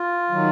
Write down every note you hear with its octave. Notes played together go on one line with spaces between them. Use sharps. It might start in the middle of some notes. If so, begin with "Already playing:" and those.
Already playing: F4
D#3 F#3